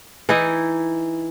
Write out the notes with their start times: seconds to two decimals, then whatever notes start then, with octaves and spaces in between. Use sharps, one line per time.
0.29 E3 D#4 E4 D#5